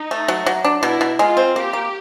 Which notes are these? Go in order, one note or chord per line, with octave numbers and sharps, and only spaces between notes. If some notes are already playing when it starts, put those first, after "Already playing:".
Already playing: D#4
A3
F#3
F#3
D4
B2 E4
B2
G#3 F4
C4
A#3 G4
A#3